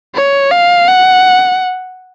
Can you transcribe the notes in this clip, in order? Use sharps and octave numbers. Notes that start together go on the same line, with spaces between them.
C#5
F5
F#5